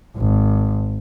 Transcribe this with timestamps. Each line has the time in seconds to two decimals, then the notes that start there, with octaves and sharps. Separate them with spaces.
0.17 G#1